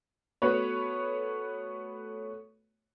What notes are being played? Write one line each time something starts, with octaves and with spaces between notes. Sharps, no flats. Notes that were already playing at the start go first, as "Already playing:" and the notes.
A3 B3 F#4 B4 C#5